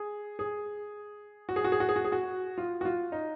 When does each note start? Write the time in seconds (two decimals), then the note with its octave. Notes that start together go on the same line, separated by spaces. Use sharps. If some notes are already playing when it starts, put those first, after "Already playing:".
Already playing: G#4
0.39 G#4
1.49 F#4
1.56 G#4
1.64 F#4
1.72 G#4
1.80 F#4
1.89 G#4
1.96 F#4
2.05 G#4
2.12 F#4
2.58 F4
2.81 F#4
2.85 F4
3.12 D#4